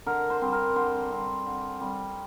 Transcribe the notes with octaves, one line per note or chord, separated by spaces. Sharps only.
D3 A#4
C5
G3 C4
A#4
D3 C5
G3 C4
D3
G3 C4